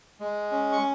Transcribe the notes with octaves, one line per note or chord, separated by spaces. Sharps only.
G#3
C#4
C#6